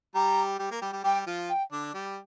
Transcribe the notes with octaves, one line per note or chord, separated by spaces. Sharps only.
G3 G4 A#5
G3 G4
A#3 A#4
G3 G4
G3 G4
G3 G4 G5
F3 F4
G5
D3 D4
G3 G4